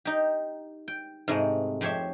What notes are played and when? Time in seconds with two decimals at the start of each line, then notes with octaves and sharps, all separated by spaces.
0.05 D#4 G4
0.88 G5
1.28 G#2 C3 G#3 A3
1.81 F2 G4 C5 C#5 E5